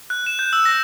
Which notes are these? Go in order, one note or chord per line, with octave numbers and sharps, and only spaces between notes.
F#6
E7
G6
E6
A#6